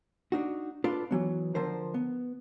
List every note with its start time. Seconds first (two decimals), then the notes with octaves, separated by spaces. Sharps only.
0.32 D4 D#4 F#4
0.84 D4 F4 A4 B4 D5
1.11 E3 F#3 B3
1.55 D3 F3 A#4 C5
1.94 B3